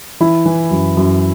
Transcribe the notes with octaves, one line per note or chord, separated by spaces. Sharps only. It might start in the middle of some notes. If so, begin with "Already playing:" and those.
E3 E4
E3
F#2
F#2